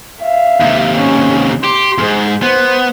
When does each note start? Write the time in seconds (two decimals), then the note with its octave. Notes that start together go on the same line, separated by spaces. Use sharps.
0.22 E5 F5
0.60 D#2 C3
0.95 C#4
1.64 G4 C6
1.98 F2 G#2 G#4
2.42 B3 C5